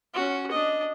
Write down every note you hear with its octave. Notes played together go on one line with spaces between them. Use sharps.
C#4 F#4
D4 D#5